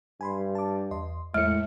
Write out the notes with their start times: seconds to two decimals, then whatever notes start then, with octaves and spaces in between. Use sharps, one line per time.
0.21 G2 G#5 B5 C6
0.55 A5 D6
0.91 E2 D#5 C6
1.34 E2 A2 G#3 C#7